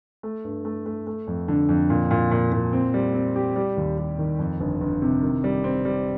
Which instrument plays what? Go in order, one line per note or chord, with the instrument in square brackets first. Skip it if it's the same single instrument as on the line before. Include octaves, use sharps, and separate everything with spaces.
[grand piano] A3
G2
A3
A3
A3
F2
D3
F2
A#2
A#2
A#2
A#2
C4
G3
C4
G4
G3
D#2
G3
D#3
F2
G1
G1
C3
D#3
G3
C4
G3